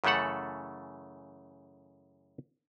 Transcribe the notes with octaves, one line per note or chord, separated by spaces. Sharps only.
F#2 C#3 E3 A3 A4 F#5